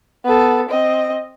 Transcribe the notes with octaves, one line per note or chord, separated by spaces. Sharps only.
B3 A4
C4 D#5